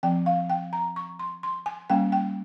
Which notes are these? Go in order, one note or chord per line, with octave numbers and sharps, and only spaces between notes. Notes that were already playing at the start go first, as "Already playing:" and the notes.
F3 C4 G5
F5
G5
A#5
C#6
C6
C6
G#5
G3 A#3 C#4 G5
G5